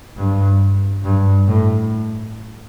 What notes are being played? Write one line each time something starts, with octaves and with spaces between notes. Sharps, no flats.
G2
G2
A2